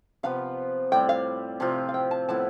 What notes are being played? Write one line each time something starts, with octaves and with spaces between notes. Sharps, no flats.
C3 F3 B3 F4 F5
A2 G3 C4 G5
F5
C3 F3 C4 F4
F5
G5
A5
A2 F3 B3 E4 A5